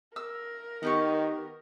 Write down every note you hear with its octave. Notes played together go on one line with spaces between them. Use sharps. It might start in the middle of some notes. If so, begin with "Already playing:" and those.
A#4 E6
D#3 B3 G4 C#6